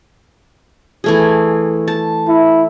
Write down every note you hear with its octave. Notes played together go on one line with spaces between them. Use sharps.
E3 A3 G#4
A5
E4